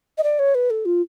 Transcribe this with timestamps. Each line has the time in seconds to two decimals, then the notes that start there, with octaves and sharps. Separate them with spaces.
0.18 D#5
0.23 D5
0.39 C#5
0.55 B4
0.70 A4
0.85 F4